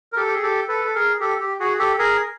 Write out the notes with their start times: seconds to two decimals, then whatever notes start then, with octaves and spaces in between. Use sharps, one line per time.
0.12 A#4
0.17 G4 A4
0.27 G4
0.35 G#4
0.42 G4 A4
0.68 A4 B4
0.85 A4
0.95 G#4 A#4
1.20 G4 A4
1.40 G4
1.60 F#4 G#4
1.79 G4 A4
1.99 G#4 A#4